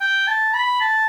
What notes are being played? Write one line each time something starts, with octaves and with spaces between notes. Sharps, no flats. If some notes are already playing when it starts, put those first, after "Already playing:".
G5
A5
B5
A5